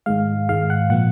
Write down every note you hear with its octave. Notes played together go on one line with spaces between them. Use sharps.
G#2 D#3 G#3 F5
G#2 D#3 G#3 F5
F#5
A#2 F3 A#3 F#5